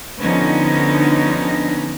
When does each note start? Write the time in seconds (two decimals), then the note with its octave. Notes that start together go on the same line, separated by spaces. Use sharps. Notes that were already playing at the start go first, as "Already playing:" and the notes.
0.21 D3 F3 B3 C#4 D#4